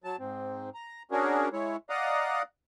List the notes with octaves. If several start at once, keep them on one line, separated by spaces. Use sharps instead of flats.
F#3 A5
G#2 C4
A#5
C#4 D4 F#4 G#4 A#4
G#3 E4 C#5
D5 D#5 F5 F#5 A#5 D#6